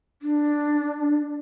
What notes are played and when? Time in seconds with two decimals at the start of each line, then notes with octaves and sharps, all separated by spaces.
0.22 D4